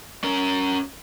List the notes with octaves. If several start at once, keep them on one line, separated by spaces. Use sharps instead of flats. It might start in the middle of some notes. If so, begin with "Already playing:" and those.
C#4 A#4